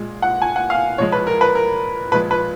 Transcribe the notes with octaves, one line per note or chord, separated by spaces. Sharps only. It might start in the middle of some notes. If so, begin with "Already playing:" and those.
Already playing: A#2 G#3
F#5
G#5
F#5
F5
A#2 F3 G#3 C#5
B4
A#4
B4
A#4
A#2 F3 G#3 B4
B4